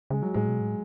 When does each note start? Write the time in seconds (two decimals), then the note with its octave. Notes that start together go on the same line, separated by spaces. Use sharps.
0.10 C#3 G#3
0.22 F#3
0.34 A2 G#3
0.48 B2
0.60 A2